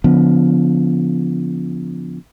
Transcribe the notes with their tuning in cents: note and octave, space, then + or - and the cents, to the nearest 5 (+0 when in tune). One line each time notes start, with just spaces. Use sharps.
D3 -40 F3 +0 B3 +0